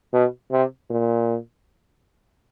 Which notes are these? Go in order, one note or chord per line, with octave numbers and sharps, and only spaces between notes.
B2
C3
A#2